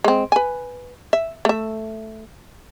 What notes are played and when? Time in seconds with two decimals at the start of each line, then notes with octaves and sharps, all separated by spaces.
0.04 G#3 C4
0.32 B4 G#5
1.13 E5
1.45 A3 E5